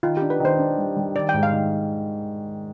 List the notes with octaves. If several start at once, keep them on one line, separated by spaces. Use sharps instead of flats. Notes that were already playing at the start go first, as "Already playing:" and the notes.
D#3 F4
D4 G4
B4
D#3 C5
D4
G3
G3
D#3 D5
G5
G#2
F5
D#3